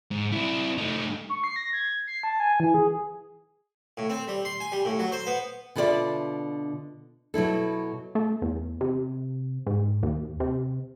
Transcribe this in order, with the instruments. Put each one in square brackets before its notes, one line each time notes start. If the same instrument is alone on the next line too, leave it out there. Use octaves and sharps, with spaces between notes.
[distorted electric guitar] G#2
C4 E4
A3 D#4
[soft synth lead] C#6
C7
A#6
G#6
C7
A5
G#5
E3
G#4
[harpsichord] A2
C4
G3
C6
G#5
G3
A2
F#3
C5
B3
[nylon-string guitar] B2 D3 F4 F#4 D5 E5
B2 F#3 E4 A4
[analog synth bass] A3
E2
C3
G#2
D#2
C3